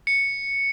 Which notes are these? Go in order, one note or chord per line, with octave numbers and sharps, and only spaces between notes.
C#7